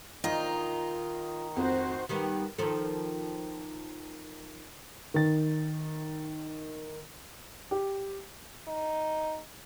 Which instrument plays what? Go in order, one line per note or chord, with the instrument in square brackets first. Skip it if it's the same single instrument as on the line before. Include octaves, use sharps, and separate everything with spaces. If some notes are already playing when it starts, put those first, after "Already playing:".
[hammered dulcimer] D#3 D#4 D#5 [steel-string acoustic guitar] F4
[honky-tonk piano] F2 [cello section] F#4 C5
[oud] D#3 G3 B3
D#3 F3 A4
[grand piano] D#3 A6
[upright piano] G4
[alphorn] D#4